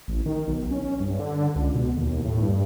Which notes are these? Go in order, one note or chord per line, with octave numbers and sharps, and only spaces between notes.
A1
D#3
B1
C#4
G2
D3
C#2
B2
D#2
A2
G2